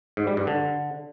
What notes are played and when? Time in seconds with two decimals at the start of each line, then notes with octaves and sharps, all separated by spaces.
0.17 G#2
0.27 G3
0.37 G2
0.47 D3